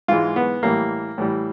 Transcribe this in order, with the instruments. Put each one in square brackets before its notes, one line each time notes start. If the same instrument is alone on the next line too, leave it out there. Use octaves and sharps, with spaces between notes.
[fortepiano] G#2 E3 G#3 F4
B3
A2 E3 G3 A#3
A2 E3 G3